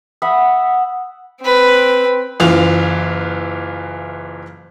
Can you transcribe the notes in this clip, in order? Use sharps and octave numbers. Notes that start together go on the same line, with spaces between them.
E5 F#5 B5 D#6
C4 B4
F#1 E3 F4 F7